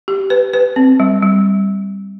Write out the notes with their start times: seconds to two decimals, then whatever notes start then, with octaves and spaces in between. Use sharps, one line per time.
0.08 G4
0.30 B4
0.54 B4
0.76 C4
1.00 G3
1.23 G3